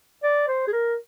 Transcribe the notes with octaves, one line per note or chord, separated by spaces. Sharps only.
D5
C5
G#4
A#4